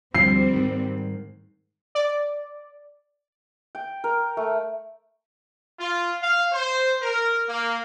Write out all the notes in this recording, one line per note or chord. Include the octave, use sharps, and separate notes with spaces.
D2 F3 G3 C4 C7
G#2 D#3
D5
G5
A#4
A3
F4
F5
C5
A#4
A#3